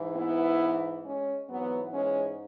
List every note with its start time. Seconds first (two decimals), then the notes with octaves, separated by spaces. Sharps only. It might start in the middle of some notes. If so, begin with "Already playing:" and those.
Already playing: G#2 E3
0.16 B3 E4
1.05 G#3 C#4
1.49 G#2 E3 F#3 B3
1.94 G#3 C#4